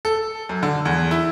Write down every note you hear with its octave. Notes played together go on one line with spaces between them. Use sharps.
A4
F#2
D3
E2
E4